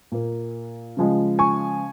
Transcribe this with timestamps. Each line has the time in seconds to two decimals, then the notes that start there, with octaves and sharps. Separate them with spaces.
0.12 A#2 A#3
0.97 C#3 F3 G#3
1.39 G#5 C#6